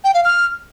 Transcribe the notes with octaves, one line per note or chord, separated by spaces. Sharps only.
G5
F5
F6